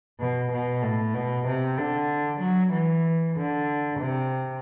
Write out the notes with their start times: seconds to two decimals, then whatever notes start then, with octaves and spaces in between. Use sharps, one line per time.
0.19 B2
0.52 B2
0.83 A2
1.14 B2
1.47 C3
1.78 D3
2.41 F#3
2.73 E3
3.36 D3
3.99 C3